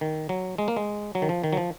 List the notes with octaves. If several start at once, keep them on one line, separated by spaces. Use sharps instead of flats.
D#3
F#3
G#3
A#3
G#3
F#3
D#3
F3
D#3
F#3
F3